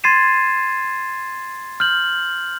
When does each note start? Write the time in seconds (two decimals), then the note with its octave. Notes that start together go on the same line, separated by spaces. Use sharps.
0.04 C6 G#6 A6 C7 D#7 E7
1.80 F6 G6 F#7